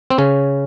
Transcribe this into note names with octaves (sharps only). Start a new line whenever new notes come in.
C4
C#3 C#4